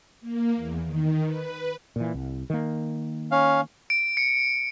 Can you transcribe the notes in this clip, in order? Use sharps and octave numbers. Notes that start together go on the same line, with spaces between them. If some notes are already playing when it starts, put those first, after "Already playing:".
A#3
E2
D#3
B4
A#2 E3
C2
D#3 A#3
C#4 F5
D7
C#7